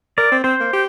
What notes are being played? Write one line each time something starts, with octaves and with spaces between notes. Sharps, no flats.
A#4 D5
C4
C4 C5
A#3
G4